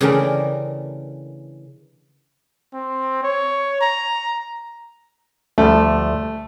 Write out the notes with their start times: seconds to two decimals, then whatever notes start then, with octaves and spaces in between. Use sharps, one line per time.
0.01 C#3 E3 A3 D4 G4 A#4
2.74 C4
3.23 C#5
3.81 A#5
5.58 D2 F3 G3 A3